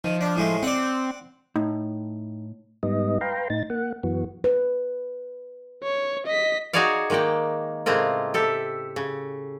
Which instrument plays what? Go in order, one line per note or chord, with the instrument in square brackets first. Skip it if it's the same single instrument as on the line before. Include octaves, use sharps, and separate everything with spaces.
[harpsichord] D#3 [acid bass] F3
[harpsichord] D4
A2 G#3 A3
[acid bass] C4 [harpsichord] D5 F#5
[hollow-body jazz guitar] A2 [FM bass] D#4
[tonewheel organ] G#2 G3 B3 D#4 D#5
B4 F5 G5 A#5 C6
A2 D#4 A6
A#3 F#5
F#2 E3 B3 F#4
[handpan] B4
[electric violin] C#5
D#5 B6
[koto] D#4 F#4 G#4 C#5 D5 F5
D#3 G#3 A#3 D5 G5
A2 C#3 G#3 A#3 C4 F4
G4 A4 E5
C#3